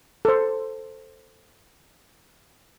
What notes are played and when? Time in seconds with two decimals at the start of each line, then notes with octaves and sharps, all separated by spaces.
0.25 A4 C5